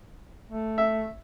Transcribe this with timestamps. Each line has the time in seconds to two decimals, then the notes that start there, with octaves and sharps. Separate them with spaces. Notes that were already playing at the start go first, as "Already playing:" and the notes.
0.50 A3
0.78 E5